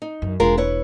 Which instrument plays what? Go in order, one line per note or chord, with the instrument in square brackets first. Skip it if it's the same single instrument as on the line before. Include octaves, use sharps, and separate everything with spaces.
[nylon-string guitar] D#4
[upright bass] F#2
[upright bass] E1 [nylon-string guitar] G#3 F4 A#4
[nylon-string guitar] E4 B4 C#5